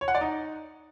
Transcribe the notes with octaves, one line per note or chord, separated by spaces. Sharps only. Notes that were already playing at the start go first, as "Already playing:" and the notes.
C#5
F#5
D5
D#4